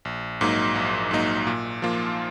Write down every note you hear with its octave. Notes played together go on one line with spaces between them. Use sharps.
A#1
G#2 F#3 A#3 D#4
A#1
G#2 F#3 A#3 D#4
A#2
F3 A#3 F4